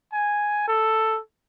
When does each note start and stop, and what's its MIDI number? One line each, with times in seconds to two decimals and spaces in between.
0.13 0.66 80
0.68 1.20 69